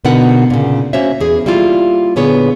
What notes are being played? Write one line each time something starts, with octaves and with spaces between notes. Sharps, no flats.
B2 D3 B3 D#4 A#4 F#5
A#2 C#3
A#3 C#4 F#4 C5 C#5 E5
E2 G#4
G3 A#3 E4 F4
A#2 D3 B3 G#4 C#5